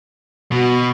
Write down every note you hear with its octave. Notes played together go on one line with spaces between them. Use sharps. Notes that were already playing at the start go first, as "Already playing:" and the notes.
B2 F#4